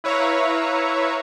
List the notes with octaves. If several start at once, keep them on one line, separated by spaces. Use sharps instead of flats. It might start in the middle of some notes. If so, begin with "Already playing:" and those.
E4 B4 C#5 E5 F5 A#5